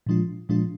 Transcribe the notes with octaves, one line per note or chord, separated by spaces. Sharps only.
A#2 F3 G#3 D4 F4
A#2 F3 G#3 D4 F4